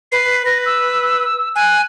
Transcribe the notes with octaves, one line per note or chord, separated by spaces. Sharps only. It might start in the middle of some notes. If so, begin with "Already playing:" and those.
B4 C7
B4 A#6
E6
G#5 F#6